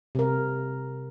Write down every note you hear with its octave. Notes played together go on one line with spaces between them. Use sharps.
C3 A#4